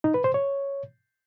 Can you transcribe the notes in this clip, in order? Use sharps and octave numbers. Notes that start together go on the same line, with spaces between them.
D#4
B4
C5
C#5